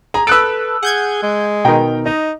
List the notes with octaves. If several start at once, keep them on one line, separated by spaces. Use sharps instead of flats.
G#4 A#5
A4 B4 E6 F#6 D7
G#4 F#5 G6 G#6
G#3
B2 D#3 G5 A#5
D#4 D#5